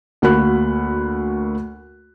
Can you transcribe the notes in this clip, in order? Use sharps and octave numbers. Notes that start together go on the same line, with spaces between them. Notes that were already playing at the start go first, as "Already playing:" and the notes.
D2 A#3 F#4 A#4 B5 F#6